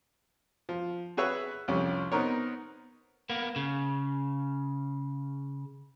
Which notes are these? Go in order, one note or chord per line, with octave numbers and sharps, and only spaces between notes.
F3
F#4 G#4 B4 C#5 E5 F#5
C2 F2 C#4 G4
B3 C4 D#4 A#4 C#5
A#3 B3
C#3